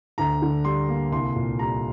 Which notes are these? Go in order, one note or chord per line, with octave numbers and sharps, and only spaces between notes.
D2 A#5
D3
G3 C6
A#3
C2 C6
A#2
G3 A#5